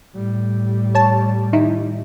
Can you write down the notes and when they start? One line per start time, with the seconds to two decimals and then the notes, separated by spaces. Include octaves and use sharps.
0.15 A2 G3
0.95 C#5 A5
1.53 D#3 D#4 E4